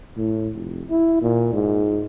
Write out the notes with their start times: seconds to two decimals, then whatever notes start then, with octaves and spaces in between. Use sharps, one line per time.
0.17 A2
0.55 F1
0.90 E4
1.22 A#2
1.54 G#2